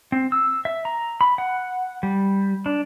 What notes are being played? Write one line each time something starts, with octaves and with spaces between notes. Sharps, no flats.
C4
E6
E5
A#5
B5
F#5
G3
D4